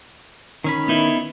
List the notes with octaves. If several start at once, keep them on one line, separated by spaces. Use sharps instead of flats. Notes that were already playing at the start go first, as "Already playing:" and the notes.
D#3 C#4 B5
B3 D#4 E4